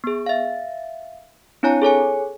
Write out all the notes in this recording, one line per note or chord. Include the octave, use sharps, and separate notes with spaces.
B3 G#4
E5 F5
C4 D4 E4 C#5 G#5 A#5
G#4 A4 C#5 G#5